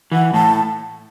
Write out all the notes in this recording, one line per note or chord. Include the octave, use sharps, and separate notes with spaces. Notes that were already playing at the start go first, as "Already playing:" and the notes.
E3 F#5
A2 A5